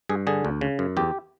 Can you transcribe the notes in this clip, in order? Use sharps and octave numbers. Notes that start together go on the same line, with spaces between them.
G2 G#4
D3 G#4
D2
C#3
F#2
E2 G4